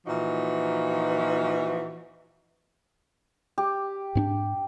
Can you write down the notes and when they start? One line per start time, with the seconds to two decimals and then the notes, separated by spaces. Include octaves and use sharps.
0.06 A#2 E3 F3 D#4 F#4
3.58 G4
4.15 G#2 C#4 D4